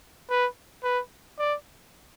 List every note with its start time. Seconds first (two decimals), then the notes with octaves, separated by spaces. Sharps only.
0.30 B4
0.84 B4
1.39 D5